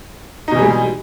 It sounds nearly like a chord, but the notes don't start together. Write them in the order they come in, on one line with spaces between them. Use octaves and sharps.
D#4 B2 E3 G3 G#3